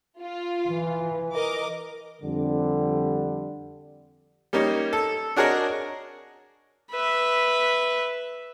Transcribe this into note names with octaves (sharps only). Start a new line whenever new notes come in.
F4
E3
A#4 D#5 D6
F2 D3 G3
G3 A#3 C#4 D#4
A4
D4 F#4 G#4 A#4 C#5 D#5
B4 E5